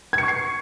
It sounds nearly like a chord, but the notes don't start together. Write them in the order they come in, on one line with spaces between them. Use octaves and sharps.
G#6 C#7 C#6 C7